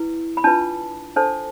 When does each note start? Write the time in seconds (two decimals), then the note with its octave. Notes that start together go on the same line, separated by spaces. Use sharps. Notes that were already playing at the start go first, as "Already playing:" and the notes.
Already playing: E4 B4
0.37 B5
0.44 D4 F4 B4 A5
1.16 D4 A4 C5 A5